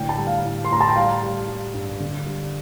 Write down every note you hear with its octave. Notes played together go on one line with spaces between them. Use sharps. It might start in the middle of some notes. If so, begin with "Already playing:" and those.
Already playing: A2 D3 G5
A5
G3
F5
A2
C6
A2 A#5
A5
G5
G3 F5
G3
G3
G2
D3
G3